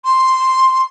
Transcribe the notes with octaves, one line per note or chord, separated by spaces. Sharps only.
C6